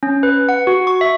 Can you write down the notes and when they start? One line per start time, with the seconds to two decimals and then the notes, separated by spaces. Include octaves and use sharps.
0.03 C#4
0.23 B4
0.49 F#5
0.67 F#4
0.87 C#6
1.01 E5